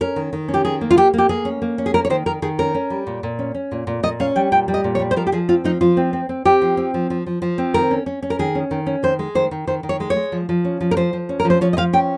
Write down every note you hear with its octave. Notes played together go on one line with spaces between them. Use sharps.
C#4 A#4
D#3
D#3
C#4
G4
D#3 G#4
A#3
F4
A#3 G4
A#3 G4
A#3 G#4
C#4
A#3
C#4
G#4
A#3 A#4
C#5
D#3 C5
D#3 A#4
D#3 G#4
C#4 A#4
C#4
G3
A#2
A#2
C#4
C#4
A#2
A#2
A#2 D#5
C#4 F5
G3 G5
A#2 G5
G3
D#5
A#2
C#5
G3
C5
F3 A#4
G4
F3 G#4
C4 F4
F3 D#4
F3 F4
C4
C4
C4
C4 G4
F3
C4
F3
F3
F3
F3
C4
D#3 A#4
C#4
C#4
C#4
A#4
D#3 G#4
C#4
D#3
C#4
D#3 C5
G#3
D#3 C5
D#3
D#3 C5
D#3
C#5
G#3
C#5
G#3
F3
F3
C#4
F3
A#4
F3 C5
F3
C#4
A#4
F3
C5
F3 C#5
D#5
F3 F5
C#4 G5